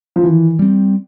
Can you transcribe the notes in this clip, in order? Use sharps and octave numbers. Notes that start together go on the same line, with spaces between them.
F3
D#3 E3
G3 C4